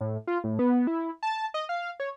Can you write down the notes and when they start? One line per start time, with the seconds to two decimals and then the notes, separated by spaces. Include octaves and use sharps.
0.01 A2
0.27 F4
0.44 A2
0.59 B3
0.87 E4
1.23 A5
1.54 D#5
1.69 F5
2.00 C#5